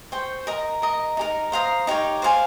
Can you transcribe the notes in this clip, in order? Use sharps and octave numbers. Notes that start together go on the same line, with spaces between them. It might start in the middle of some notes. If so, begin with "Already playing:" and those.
C5 G5 C#6
A#4 D#5 A#5
A#4 D#5 A#5
D#4 G4 A#4
C5 F5 A#5 D#6
D#4 G4 A#4 C#5
C5 F5 G#5